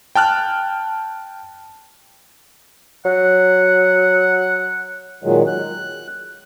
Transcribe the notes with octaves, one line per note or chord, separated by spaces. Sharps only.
G5 A5 F6 F#6
F#3 F#5
A#2 D#3 F#3 G#3
F#6